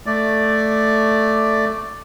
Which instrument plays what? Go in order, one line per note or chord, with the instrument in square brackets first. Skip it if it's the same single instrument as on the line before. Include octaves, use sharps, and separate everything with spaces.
[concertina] A3 D5